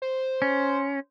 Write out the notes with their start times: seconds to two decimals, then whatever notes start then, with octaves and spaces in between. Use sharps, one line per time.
0.02 C5
0.42 C#4